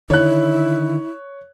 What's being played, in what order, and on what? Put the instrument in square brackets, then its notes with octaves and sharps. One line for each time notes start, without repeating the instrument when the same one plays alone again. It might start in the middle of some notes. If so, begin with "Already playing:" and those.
[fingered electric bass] D3 D#3 [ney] E4 [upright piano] C#5 F#6